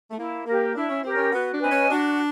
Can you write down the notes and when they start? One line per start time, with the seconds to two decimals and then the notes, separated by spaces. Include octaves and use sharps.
0.11 A3
0.18 A#3 E4
0.47 A#3 G4 A#4
0.75 D4 E4
0.89 C#4
1.03 C4 G4 A#4
1.15 C#4
1.33 B3 F#4
1.52 D4
1.61 C4 B4 D#5 G#5
1.71 C#4
1.90 D4 F#4